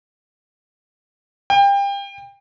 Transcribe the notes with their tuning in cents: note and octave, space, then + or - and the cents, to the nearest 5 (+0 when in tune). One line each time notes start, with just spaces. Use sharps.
G5 +30